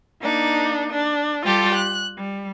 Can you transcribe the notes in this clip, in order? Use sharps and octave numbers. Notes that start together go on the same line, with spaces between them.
A#3 D4 D#4
D4
G3 F4 G4 A4
F#6
G3